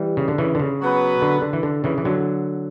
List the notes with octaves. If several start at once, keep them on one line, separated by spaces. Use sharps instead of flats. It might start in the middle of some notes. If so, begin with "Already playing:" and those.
Already playing: E3 G3
C#3
D3
C#3 E3
D3
C#3
F#3 B3 F#4 B4
D3
D3
E3
D3
C#3 E3
E3
D3 F#3